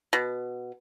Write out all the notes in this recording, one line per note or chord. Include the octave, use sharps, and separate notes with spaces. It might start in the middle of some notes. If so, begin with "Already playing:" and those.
B2